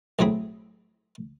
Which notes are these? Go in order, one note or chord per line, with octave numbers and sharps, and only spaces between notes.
B1 A2 F#3 C4 G#4 B5